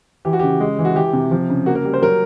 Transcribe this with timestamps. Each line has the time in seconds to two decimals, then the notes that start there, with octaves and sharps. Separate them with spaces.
0.25 E3 G4
0.33 F#4
0.39 C#3 G4
0.60 G#3
0.79 E3
0.85 F#4
0.95 E3 G4
1.13 C3
1.31 F3
1.50 C#3
1.66 A#3 F#4
1.75 A#4
1.85 G3
1.94 C5
2.02 F#3 A#4